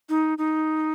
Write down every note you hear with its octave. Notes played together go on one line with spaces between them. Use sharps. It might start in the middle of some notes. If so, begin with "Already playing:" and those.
D#4
D#4